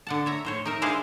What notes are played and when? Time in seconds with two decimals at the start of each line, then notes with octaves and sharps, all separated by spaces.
0.07 D3 F#5 A5
0.26 C#5 E5 A#5
0.45 A2 C5 C#5
0.65 D#4 A#4 E5
0.82 G#3 D4 E4 G#4 C5 F5